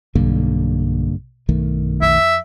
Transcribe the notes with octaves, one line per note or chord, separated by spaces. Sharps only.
B1 G2 D3 A#3
B1 G2 D#3 A3
F2 E5